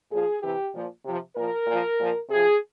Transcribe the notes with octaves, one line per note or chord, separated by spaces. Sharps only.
A#2 F3 G#4
C3 E3 G4
A#2 F3
C3 F3
A#2 F3 A#4
A#2 F3
A#2 F3
C3 F3 G#4